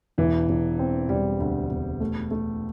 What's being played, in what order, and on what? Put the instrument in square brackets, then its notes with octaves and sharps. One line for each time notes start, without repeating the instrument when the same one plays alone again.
[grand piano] E1 [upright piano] E3
[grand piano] E1
C4
[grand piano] E1 [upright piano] G3
[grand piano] D2
E1
A3
A3